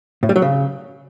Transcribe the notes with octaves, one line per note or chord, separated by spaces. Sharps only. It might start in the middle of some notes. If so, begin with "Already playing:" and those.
A2
G3
F#3
C#3